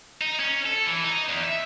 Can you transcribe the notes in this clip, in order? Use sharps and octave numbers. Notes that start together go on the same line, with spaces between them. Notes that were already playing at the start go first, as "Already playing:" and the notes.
D#4
C#4
A4
E3
D#4
E2
E5